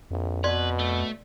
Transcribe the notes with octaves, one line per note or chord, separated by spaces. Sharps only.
A#1 F2
B2 B4 D5 C6
A3